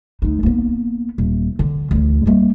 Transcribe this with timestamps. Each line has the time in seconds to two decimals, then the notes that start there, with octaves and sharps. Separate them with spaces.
0.22 D2 D#4
0.43 A#3 B3
1.18 D#1
1.59 D3
1.91 D2 E3
2.26 G3 A#3